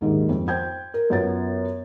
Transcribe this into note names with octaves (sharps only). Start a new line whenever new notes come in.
A#1 D#2 G#2 D#3 G#3 A#3
F2
C5 G5 G6 G#6
A#4
F#2 B3 F4 A6